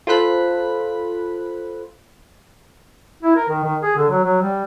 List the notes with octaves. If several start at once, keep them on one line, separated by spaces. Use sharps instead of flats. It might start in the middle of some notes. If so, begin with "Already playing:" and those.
F4 A4 C5 B5 F#6 B6
E4
A#4
D#3
D#3
G#4
D3
F#3
F#3
G3